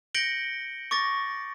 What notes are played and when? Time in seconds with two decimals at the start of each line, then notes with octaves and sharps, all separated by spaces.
0.14 G6 A#6 C#7 D7 F#7 G7
0.91 C#6 D6 A6 A#6